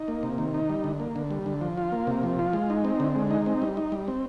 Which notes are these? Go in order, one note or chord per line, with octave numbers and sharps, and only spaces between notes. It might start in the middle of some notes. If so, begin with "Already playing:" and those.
Already playing: D#4
A#3
C3
D#3
D#4
G3
D3
A#3
D3
G3
D3
F3
F4
A#3
C3
F3
F4
G#3
D#4
C4
D3
G#3
D#4
C4
G3
D#4
G3
C4